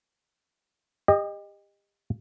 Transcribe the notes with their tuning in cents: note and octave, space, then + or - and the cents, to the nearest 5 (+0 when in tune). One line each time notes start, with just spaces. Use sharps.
G4 +35 D#5 -15